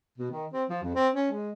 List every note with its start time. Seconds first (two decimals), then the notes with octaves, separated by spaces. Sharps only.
0.18 B2
0.31 D#3
0.53 C4
0.69 F3
0.82 F2
0.95 C4
1.14 C#4
1.31 G#3